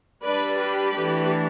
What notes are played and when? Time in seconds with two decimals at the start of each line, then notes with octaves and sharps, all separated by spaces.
0.24 G3 D4 B4 D5
0.60 G4 B4
0.97 E3 A3 D4